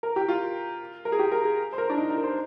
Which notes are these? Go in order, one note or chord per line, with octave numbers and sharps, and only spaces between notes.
A#4
G4
F4
A#4
G#4
G4
A#4
G#4
C5
A#4
D4
D#4
D#4
A#4
C5